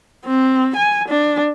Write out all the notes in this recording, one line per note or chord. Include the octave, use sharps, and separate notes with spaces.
C4
G#5
D4